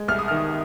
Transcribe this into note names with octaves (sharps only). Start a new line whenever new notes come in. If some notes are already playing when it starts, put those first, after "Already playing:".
Already playing: G#3
C2 F6
D#6
D#3 F6